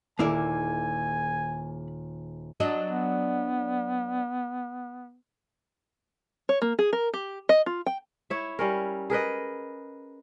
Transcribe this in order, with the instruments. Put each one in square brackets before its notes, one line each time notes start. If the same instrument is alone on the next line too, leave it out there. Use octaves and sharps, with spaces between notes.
[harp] D#1 [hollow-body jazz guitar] A#3 E4 D5 [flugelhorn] G#5
[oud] F#3 D4 D#5
[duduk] B3
[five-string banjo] C#5
A#3
G#4
A#4
G4
D#5
F4
G5
[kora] E4 C#5 E5
G3 C#4 A#4
G#4 A#4 B4 D#5